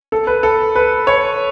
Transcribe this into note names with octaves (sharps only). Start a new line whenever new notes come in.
A4
B4
A4
B4
C#5